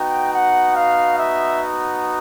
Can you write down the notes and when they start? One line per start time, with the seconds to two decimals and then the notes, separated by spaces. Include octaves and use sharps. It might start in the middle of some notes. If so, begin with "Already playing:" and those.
Already playing: B3 D#4 F#4 G5
0.33 F#5
0.76 F5
1.18 E5